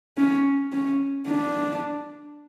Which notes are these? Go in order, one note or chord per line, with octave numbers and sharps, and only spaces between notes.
C#4
C#4
D4